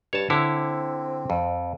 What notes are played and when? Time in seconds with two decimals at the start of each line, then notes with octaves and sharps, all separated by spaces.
0.13 G2 C#5 A5
0.30 D3 C4 E4 C#5
1.30 F2